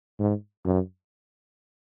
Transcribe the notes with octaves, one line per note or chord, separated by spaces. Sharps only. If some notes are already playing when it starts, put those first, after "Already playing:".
G#2
F#2